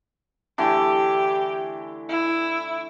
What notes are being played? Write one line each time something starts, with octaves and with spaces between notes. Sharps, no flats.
D3 E3 A3 G4
E4